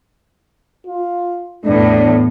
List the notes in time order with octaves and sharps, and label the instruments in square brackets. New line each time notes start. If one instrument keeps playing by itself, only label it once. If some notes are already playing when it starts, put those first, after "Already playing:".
[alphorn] F4
[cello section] E2 A2 [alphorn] D4